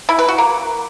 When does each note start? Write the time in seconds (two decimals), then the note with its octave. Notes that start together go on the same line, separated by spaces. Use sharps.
0.09 E4
0.19 B4
0.28 F#4
0.38 A#3